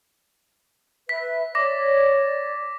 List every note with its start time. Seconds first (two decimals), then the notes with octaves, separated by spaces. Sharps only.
1.09 B4 E5 B6
1.55 C#5 D5 D6 A#6